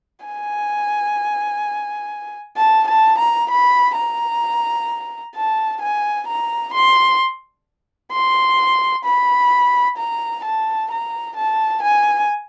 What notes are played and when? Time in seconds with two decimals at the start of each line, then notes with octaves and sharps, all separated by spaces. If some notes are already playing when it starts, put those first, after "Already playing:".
0.25 G#5
2.57 A5
2.88 A5
3.19 A#5
3.50 B5
3.96 A#5
5.35 A5
5.82 G#5
6.28 A#5
6.74 C6
8.12 C6
9.05 B5
9.97 A#5
10.45 A5
10.91 A#5
11.36 A5
11.82 G#5